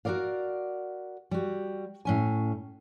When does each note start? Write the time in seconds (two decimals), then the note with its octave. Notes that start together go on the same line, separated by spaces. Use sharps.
0.05 F#4 A4 A#4 D5 F5
1.31 G3 F#4
2.05 A2 C#4 G#5